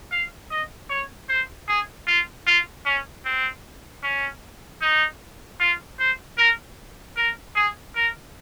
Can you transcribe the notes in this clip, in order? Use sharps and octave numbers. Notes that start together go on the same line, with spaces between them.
F5
D#5
C#5
C5
G#4
F4
F4
C#4
C4
C#4
D#4
F4
C5
A#4
A#4
G#4
A#4